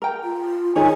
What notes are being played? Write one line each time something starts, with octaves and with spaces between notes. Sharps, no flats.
A#4 G5
F4
D#3 G#4 C#5 G#5 A#5